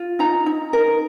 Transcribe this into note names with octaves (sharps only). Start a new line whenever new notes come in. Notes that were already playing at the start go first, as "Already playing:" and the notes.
Already playing: F4
D#4 A#5
D#4
A#4